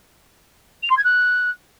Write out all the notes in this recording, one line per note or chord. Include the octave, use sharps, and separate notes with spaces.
F7
C6
G#6
F#6